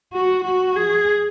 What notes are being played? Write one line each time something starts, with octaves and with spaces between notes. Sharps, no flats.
F#4
F#4
G#4